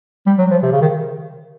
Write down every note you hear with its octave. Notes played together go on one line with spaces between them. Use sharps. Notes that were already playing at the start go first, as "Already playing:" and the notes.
G3
F#3
F3
C3
C#3
D#3